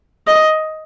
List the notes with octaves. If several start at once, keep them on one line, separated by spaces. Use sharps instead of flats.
D#5